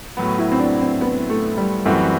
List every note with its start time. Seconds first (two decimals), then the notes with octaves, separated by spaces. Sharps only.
0.17 A2 F#3 B3
0.38 E4
0.52 C4
0.59 D4
0.81 C4
1.01 B3
1.30 A3
1.57 G3
1.85 F#2 E3 G3 A3 C4 F#4